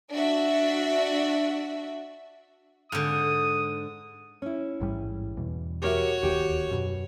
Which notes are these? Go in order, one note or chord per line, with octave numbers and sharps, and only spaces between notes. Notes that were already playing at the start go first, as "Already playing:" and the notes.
D4 F#4 E5
G#2 D3 D#6
C#4 E4
A1 G#2 G3
E2 B2
F#4 G4 A#4 C#5 E5
D1 G#1 D#2 G4
F#2 B2